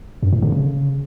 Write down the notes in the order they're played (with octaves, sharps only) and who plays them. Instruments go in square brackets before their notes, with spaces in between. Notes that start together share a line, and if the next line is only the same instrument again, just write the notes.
[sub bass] F#2
A2
D3
C#3